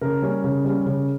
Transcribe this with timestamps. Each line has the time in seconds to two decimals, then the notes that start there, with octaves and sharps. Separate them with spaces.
0.01 C#3 A#4
0.22 G3 C#4
0.44 C#3
0.64 G3 C#4
0.86 C#3